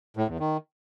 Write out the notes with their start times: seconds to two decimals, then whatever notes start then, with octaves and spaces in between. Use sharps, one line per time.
0.17 A2
0.28 E2
0.40 D#3